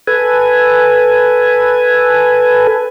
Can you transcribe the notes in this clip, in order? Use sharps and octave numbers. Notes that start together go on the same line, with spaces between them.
A4 B4 G#5